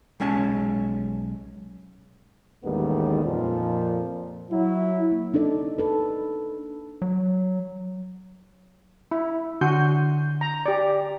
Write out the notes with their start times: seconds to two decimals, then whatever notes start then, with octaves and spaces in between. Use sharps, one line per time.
0.20 B1 G#3 C#4 G#5 A5
2.64 A1 D#2 D#3 G3 G#3 B3
3.24 F2 A#2 F3
4.51 F#3 E4
5.12 A#3
5.34 D4 D#4 A4 D5
5.78 A4 B4
7.02 F#3
9.11 E4
9.61 D3 F#4 C6 G6
10.41 A#5
10.66 G4 D5